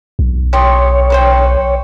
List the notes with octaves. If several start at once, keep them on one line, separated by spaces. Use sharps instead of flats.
B1
G4 C#5 C6 D#6
B4 C5 G5